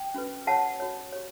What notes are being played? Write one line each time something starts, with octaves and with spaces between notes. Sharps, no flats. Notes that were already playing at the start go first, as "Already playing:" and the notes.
Already playing: G5
C#4 F#4 B4
F#4 C#5 F#5 A5
F#4 C#5
G4 C#5